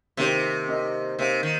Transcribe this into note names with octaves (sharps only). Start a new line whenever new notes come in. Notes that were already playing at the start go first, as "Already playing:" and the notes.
C3 D#3 A#3 G4 C5
A#3 D#4 G4 A#4 D#5
C3 A#3 D#4 C5 F5
D#3